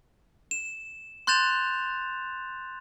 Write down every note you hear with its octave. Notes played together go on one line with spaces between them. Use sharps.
E7
C6 F#6 G6 A6 E7 F7